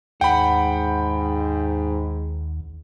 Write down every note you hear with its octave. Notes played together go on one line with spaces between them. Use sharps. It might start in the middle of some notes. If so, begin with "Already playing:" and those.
D#2 G#2 F#5 G5 B5